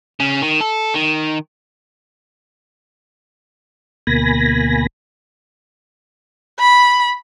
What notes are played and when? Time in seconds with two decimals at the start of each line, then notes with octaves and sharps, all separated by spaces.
0.20 C#3
0.42 D#3
0.61 A4
0.94 D#3
4.07 D2 B2 A#3 G#5 B5 A#6
6.59 B5